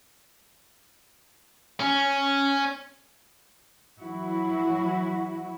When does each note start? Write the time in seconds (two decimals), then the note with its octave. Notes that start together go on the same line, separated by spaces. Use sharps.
1.80 C#4
4.00 E3 F#3 E4 F#4